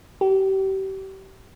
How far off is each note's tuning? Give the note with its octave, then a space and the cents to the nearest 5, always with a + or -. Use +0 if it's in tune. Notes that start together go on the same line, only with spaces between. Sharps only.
G4 -35